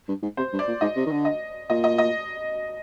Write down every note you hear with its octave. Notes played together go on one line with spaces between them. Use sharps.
G2
G#2
C3 C5
G2
D5
A#2
G#2 D#5
C3
D#3
D3
D#5
A#2 D#5
D#5
D#5